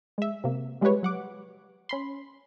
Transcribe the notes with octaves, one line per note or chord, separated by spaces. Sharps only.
G#3 E5
C3 A#3
G3 G#3 F4 G4 B4 C#5
F#3 F#5 D6
C#4 B5 C6